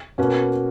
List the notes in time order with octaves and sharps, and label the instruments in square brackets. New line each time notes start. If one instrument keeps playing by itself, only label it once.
[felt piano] B2 A#3 C#4 F#4 B4